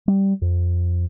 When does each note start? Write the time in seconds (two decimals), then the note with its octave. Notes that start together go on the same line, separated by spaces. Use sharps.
0.08 G3
0.42 F2